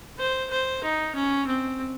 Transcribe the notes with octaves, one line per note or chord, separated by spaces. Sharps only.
C5
C5
D#4
C#4
C4